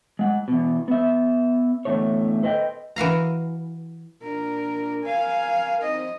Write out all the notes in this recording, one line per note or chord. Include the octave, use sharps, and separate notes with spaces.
G#3 F#5
E2 B2
B3 E5
E2 A2 D3 A3 C#5
A4 B4 C5 D#5 F#5 G5
E3 F#4 F5 A#5
A#2 D4 A#4
A#4 F5 G#5
C4 D#4 D#5